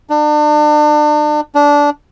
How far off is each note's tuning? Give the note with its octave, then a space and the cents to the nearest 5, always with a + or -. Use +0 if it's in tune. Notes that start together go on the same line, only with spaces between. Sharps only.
D4 +35
D4 -15